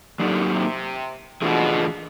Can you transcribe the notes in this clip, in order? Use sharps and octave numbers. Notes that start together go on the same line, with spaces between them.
D3 F#3 A#3 D#4 G4
C3
B2 E3 A3 D4 F4 G#4